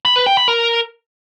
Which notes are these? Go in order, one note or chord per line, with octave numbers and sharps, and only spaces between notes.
B5
B4
G5
B5
A#4